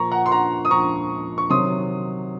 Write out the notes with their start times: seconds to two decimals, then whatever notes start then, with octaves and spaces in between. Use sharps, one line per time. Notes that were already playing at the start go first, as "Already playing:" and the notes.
Already playing: A#2 F3 A#5 C#6
0.11 F#5 A#5
0.26 C6
0.32 F#5 A#5
0.65 D#6
0.71 A#2 F3 A#5 C#6
1.38 C#6
1.50 C3 D#3 F#3 C6 D#6